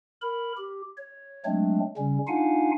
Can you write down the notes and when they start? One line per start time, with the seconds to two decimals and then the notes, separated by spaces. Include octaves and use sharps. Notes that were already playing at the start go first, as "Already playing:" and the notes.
0.22 A#4 B5
0.57 G4
0.97 C#5
1.45 F#3 G#3 A3 C4 D4
1.97 C#3 G3 C#4
2.28 D4 D#4 F4 F5 F#5 G#5